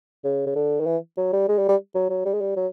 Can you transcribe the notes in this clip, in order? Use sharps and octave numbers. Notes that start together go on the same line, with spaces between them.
C#3
C#3
D3
D#3
E3
F#3
G3
G#3
G3
G3
F#3
F#3
G3
G#3
G3
F#3